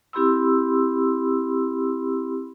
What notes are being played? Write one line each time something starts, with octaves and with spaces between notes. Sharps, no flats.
C4 E4 G4 B5 C6 E6